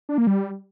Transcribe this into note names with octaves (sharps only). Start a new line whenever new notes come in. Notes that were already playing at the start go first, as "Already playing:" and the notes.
D4
A#3
G3